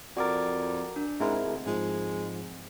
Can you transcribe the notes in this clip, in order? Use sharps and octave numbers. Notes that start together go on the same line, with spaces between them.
F2 F#4 A#4 D5 D6 A6
D4
G#2 G#3 C4 E4 A#4
D2
G#2 F3 G#3